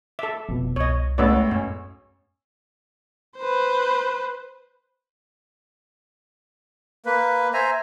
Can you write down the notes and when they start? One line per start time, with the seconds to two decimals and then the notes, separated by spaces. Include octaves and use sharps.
0.19 A4 E5 D6
0.48 F1 F2 B2
0.76 C2 C#5 D#5
1.18 A1 G#3 A3 B3 F#4 C#5 D5 E6
1.51 F#2 C#4
3.39 B4 C5
7.06 A#3 B4
7.54 C5 E5 G#5 A#5